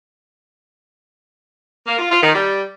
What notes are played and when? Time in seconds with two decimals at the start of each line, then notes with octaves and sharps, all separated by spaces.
1.87 A#3
1.99 F4
2.10 F4
2.22 D#3
2.33 G3